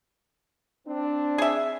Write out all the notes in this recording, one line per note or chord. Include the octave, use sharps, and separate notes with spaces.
C4 D4
G#4 E5